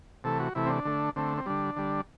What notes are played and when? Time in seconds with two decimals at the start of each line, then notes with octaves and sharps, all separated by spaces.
0.24 C3 E3 A3 A4
0.40 F#4
0.55 C3 E3 A3 E4
0.66 C4
0.70 D4
0.85 D3 A3
1.16 D3 A3 C4
1.38 C4
1.46 D3 G3 D4
1.76 D3 G3